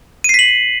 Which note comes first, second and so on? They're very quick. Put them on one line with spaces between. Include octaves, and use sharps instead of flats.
D#7 C7 B6 F#7